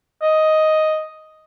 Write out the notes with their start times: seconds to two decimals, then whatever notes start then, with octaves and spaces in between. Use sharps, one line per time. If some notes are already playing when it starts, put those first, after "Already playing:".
0.22 D#5